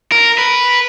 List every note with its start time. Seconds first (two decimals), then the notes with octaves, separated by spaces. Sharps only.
0.12 A#4
0.38 B4